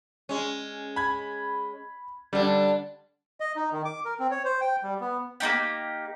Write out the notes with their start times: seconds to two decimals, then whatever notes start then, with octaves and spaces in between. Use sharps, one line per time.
0.29 G#3 C#4
0.96 B5 G#6
2.33 D3 G3 D4
3.40 D#5
3.56 D#4
3.72 D#3
3.85 D6
4.05 A#4
4.20 C4
4.31 C#5
4.45 C5
4.61 G5
4.83 G3
5.01 B3
5.40 A#3 B3 D#4 G4